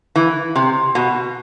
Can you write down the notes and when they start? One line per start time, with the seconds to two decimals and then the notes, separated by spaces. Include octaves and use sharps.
0.16 E3
0.55 C3
0.95 B2